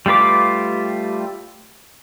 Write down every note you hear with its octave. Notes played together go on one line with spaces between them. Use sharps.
G3 A3 F4 B4 D6